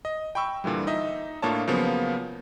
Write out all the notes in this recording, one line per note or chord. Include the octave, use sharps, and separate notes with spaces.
D#5
G5 B5 C#6 E6
A#2 D3 E3 G3
D#4 D#5 E5
A2 A#3 D4 F4 C#5 A5
C#3 F3 F#3 A#3 B3